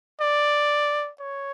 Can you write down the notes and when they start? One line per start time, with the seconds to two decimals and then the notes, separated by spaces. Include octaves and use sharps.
0.21 D5
1.20 C#5